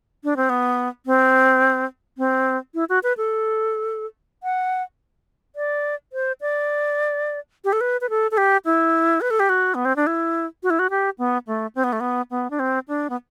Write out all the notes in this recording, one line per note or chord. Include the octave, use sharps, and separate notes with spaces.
D4
C4
B3
C4
C4
E4
F#4
B4
A4
F#5
D5
C5
D5
G4
A4
B4
B4
A4
A4
G4
E4
B4
A4
G4
F#4
B3
C4
D4
E4
F#4
E4
F#4
G4
B3
A3
C4
B3
A3
B3
B3
D4
C4
D4
B3